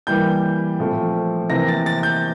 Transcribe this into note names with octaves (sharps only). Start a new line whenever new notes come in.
E3 G3 A#3 G6
A#2 F3 A3 C4
C3 E3 A#3 A#6
A6
A6
G6